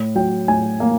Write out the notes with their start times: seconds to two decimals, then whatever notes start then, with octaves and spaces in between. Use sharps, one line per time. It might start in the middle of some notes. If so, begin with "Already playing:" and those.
Already playing: A2
0.15 F#3 G5
0.48 A2 G#5
0.80 A#3